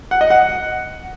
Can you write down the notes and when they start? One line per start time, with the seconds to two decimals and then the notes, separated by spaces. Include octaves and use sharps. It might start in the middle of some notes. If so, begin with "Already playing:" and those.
0.11 F#5
0.21 D#5
0.30 F#5